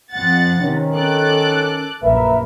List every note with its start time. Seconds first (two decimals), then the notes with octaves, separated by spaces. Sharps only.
0.12 F2 F#5 A6
0.62 C3 D#3 C#4
0.96 A4 D6 F#6
2.03 A#1 F#2 A#4 B4 E5